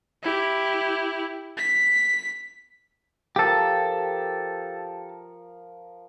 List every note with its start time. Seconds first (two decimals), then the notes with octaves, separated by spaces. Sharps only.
0.23 E4 G4
1.57 B6
3.36 F3 G4 A4 A#4